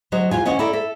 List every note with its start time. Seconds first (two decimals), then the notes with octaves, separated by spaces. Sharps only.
0.12 D2 F#3 C5 D#5
0.31 E2 F4 G#5
0.45 D2 C#4 D#5 F#5 G#5
0.59 E4 A4 A#4 D5
0.73 A4 E5